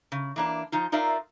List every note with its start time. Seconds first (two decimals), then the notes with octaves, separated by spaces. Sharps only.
0.12 C#3
0.36 E3 A#3 D4
0.72 F3 D#4 F4
0.92 D#4 F4 A#4 D5 E5 F5